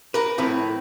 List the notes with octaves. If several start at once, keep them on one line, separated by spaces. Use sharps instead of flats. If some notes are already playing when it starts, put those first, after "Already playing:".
A#4 B4
A2 F3 C4 B4